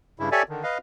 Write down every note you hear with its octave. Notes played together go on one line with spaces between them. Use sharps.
G2 C#3 E4
G4 A4 C#5 D5 E5 G#5
D3 D#3
B4 D#5 F5